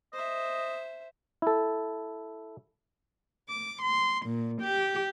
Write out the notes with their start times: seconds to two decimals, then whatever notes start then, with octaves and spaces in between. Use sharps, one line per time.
0.13 C5 D#5 E5
1.42 E4 A4
3.49 D6
3.82 C6
4.26 A#2
4.61 G4